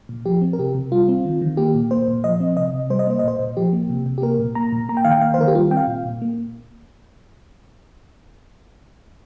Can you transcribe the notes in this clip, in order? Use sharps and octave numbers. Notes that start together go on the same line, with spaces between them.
A#2
F3 G4
C4
A#4
C3 G4
C3
G3 F4
C4
D#3
D#3
A#3 G4
A#2
A#3 C5
A#2
F3 D#5
C4
C3 D#5
C3
G3 C5
D#5
A#3 C5
D#5
A#2 C5
A#2
F3 G4
A#3
C3
C3
G4
A#3 A#4
A#2
A#3 A#5
A#2
A#3 A#5
G5
D#3 F5
G5
A#3 F5
C5
D#3 A#4
G4
G3 F4
C4 G5
F5
A#2
A#2
A#3